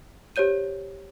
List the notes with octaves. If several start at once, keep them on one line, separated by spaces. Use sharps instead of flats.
G4 C5 C#5 G6 D#7